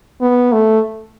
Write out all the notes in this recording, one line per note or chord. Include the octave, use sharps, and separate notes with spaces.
B3
A3